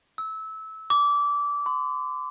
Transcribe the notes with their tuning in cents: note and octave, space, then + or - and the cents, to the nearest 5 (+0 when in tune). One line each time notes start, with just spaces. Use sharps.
E6 -20
D6 -20
C6 -45